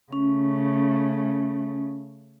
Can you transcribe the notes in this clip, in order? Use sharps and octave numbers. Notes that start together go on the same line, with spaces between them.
C#3 A3 C#4